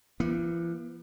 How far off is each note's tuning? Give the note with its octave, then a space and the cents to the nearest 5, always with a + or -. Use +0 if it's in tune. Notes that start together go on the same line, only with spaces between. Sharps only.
E3 +45 B3 -40